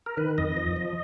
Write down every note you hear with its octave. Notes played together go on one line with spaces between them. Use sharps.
A#4
D#3 B4
F2 D#5
F3
F3